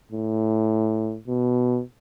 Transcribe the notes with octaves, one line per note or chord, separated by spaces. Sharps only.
A2
B2